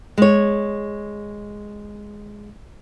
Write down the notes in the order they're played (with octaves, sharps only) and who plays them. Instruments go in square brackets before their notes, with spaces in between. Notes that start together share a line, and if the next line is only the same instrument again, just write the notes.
[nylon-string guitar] G#3 C#5